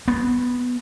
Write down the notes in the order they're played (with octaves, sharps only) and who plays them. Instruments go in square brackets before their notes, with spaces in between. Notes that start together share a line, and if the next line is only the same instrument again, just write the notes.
[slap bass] B3